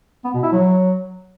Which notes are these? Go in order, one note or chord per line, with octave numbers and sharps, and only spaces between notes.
B3
B2
E4
F#3